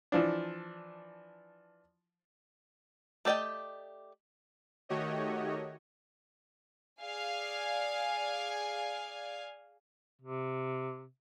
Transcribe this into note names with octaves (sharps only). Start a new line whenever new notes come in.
E3 F3 D4
A3 G4 D5 D#5 G5
D#3 A3 F#4 G4 C#5 D#5
G#4 D5 F5 G#5
C3